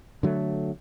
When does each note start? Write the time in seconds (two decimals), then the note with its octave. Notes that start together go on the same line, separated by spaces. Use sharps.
0.23 D3 F#3 G#3 A3